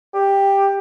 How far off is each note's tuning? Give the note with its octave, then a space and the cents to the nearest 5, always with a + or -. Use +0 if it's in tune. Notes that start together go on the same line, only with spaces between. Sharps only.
G4 +10